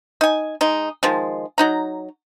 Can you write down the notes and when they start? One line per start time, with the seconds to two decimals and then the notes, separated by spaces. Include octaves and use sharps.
0.21 D#4 G#5
0.61 G#3 D#4
1.03 D#3 F3 G#3
1.58 F#3 D#4 A#5